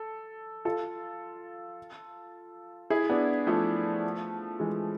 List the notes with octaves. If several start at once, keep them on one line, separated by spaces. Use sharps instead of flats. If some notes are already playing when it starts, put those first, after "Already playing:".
Already playing: A4
F4 A4
E4 G#4
B3 D4
F3 A3
E3 G#3